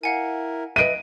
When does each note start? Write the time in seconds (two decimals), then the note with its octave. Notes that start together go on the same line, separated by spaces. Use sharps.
0.03 E4 A#4 F5 F#5 G#5
0.76 B4 D#5 E5 D7 D#7